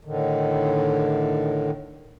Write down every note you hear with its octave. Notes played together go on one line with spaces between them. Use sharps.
A2 D3 D#3